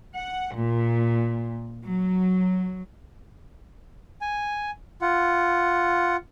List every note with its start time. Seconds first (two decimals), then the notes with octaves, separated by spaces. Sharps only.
0.15 F#5
0.55 A#2
1.85 F#3
4.21 G#5
5.02 F4 F#5